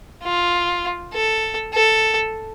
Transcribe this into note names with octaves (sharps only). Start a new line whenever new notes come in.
F4
A4
A4